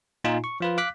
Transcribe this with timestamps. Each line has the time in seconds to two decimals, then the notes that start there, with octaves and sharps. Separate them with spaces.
0.24 A#2 D#4 F4 G#5
0.44 C#6
0.60 F3 F4 B4
0.77 F5 D6 F#6 B6